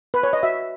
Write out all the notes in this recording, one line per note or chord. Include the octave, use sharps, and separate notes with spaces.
B4
C#5
D#5
F#4 E5